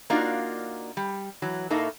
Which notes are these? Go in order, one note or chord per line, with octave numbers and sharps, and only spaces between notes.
A#3 D4 D#4 F4 F#4 D5
G3
E3 F#3
A2 A3 A#3 D#4 A4